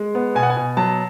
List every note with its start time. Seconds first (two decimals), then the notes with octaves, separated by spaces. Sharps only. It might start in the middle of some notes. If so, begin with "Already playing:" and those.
Already playing: G#3
0.15 B3
0.35 B2 G#5
0.43 F#5
0.50 G#5
0.57 B2
0.77 F#3 A5